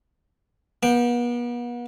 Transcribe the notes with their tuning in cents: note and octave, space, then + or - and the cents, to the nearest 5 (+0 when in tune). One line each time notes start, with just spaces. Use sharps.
B3 -40 G5 +0